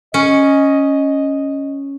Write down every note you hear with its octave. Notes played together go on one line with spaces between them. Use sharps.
C#4 D#5